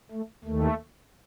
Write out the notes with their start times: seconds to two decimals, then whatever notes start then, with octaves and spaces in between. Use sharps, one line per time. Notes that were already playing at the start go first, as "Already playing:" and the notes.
0.11 A3
0.44 D#2 D#3 A3